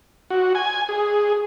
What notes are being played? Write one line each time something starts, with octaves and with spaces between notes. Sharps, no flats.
F#4
G#5
G#4